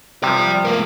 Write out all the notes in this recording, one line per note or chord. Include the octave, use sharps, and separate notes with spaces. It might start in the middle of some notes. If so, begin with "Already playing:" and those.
C3 F3 D5 G5
A3 A#4